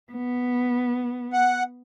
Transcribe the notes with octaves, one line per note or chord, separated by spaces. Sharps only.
B3
F#5